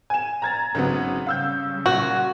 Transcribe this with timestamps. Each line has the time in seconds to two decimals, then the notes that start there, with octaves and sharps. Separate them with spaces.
0.10 G#5 E7
0.42 A#5 G#6 A6
0.74 G#1 C#3 F#3 B3
1.27 C#3 G3 F5 E6 G6
1.86 A#2 F#4